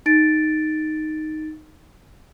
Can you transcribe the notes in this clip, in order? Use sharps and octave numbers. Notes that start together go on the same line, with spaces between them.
D#4 A6 D7